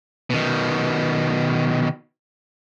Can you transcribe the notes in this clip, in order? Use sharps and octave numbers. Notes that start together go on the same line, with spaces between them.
B2 D#3